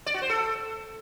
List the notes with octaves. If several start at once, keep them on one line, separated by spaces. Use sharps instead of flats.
D5
F#4
C5
A4